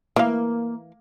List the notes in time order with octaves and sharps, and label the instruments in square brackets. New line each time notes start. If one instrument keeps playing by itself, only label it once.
[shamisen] E3 F5 [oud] A#3